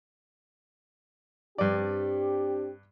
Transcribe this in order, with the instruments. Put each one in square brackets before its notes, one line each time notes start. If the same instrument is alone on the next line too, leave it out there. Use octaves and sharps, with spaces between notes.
[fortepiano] G2 D5 [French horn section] C4 D4 G4